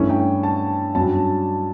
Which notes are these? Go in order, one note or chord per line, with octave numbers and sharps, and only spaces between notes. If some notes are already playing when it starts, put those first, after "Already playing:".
Already playing: G2 E3 A3 C#4
G5
A5
G2 F#3 C#4 A5